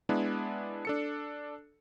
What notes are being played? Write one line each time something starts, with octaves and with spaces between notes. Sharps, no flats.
G#3 B3 D4 E4
D4 A4 C#7